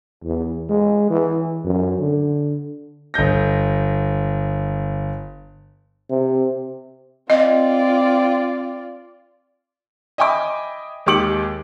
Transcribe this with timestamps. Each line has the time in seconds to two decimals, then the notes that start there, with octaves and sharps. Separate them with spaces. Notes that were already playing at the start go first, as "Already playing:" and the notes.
0.25 E2
0.69 G#3
1.10 E3
1.64 F#2
1.99 D3
3.14 G1 D#5 G6 A#6
6.10 C3
7.30 C4 F4 D5 D#5
10.18 D#5 E5 G5 G#5 B5 D6
11.06 D#2 G#3 G4 D6 C#7 F#7